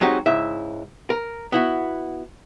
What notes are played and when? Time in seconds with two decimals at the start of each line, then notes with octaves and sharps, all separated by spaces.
0.01 F#3 G#3 C4 D#4 F#4 G4
0.26 C#2 G#2 E4 E5
1.10 A#4
1.52 B3 E4 F#4